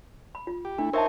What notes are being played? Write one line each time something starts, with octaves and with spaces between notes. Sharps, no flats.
B5
F4
G4
A3 D4 E4
D#4 A#4 C5 C#5 E5 A5